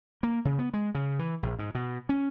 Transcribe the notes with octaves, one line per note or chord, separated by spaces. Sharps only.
A#3
C#3
B3
G#3
C#3
E3
A#1
G#2
B2
C#4